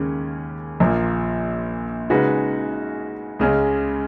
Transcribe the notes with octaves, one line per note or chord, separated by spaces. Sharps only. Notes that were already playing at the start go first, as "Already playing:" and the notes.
Already playing: D#2 C#3 G#3 C#4
A#1 A#2 F3 A#3
C#3 G#3 D#4 F#4 B4
C#2 C#3 G#3 C#4